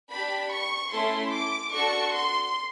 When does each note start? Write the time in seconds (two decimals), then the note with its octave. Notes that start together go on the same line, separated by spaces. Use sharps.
0.10 D4 G4 B5
0.50 C#6
0.91 A3 C#4 E4 A4 C6
1.32 D6
1.73 D4 F#4 A4 C#6
2.14 C6